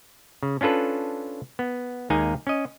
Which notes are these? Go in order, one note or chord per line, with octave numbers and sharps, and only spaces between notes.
C#3
C#4 D4 F4 A4 B4
B3
D#2 G#3 A#3 D#4 G#4 G#5
C#4 D#5